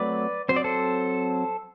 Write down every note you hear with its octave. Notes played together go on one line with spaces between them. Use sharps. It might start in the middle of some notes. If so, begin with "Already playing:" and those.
Already playing: F#3 A3 C4 B4 D5
F#3 C4 C5
D5
A4 C5